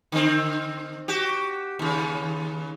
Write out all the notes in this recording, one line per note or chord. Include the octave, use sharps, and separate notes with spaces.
D3 C4
F#4 G4
D#2 C#3